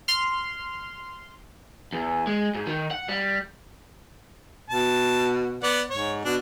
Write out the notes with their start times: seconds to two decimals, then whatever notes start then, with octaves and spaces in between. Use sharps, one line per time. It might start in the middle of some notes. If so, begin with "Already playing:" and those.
0.08 C6 F6
1.92 E2
2.27 G#3
2.55 G#2
2.67 D#3
2.91 F#5
3.09 G3
4.70 B2 A5
5.63 B3 D5 F#5
5.90 G#2 C#5
6.25 B2 D4